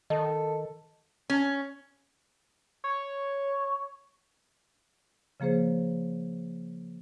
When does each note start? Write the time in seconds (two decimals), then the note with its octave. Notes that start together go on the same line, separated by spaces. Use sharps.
0.10 D#3 A4 D#5
1.30 C#4
2.84 C#5
5.40 C#3 F3 A#3 G#4 C5